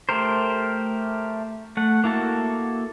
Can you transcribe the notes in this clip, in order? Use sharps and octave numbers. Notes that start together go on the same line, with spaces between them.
A3 G4 A#4 C5
A3 F#5
A#3 E4 F#4 A4